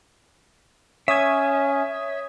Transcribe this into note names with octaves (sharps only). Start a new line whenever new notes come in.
C#4 C#5 E5 D#6 G#6